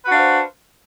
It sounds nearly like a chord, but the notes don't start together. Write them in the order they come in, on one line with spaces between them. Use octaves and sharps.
B4 F#4 D4 F5 C5